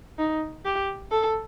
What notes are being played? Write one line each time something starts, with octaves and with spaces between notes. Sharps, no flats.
D#4
G4
A4